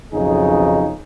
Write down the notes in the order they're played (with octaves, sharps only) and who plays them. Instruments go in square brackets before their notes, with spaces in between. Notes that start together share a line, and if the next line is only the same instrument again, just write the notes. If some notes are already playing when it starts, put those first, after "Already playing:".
[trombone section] B1 F2 C#3 D#4 G#4